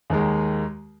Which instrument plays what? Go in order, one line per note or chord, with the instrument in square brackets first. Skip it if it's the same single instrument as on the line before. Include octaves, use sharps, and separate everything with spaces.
[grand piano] D#2 D#3 G#3